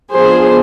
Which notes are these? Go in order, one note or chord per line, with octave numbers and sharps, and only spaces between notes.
F3 B3 D4 G#4 C5